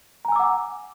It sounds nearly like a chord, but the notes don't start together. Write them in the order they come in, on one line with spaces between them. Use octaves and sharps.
A#5 G#5 E6 D6 F#5